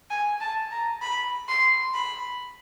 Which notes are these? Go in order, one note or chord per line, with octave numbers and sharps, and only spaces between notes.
G#5
A5
A#5
B5
C6
B5